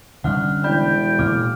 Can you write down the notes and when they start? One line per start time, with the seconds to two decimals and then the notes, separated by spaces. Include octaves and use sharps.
0.24 D3 G3 C#4 F#5 F6 F#6
0.64 E1 D5 G5 B5 G6
1.19 A#2 D6 F6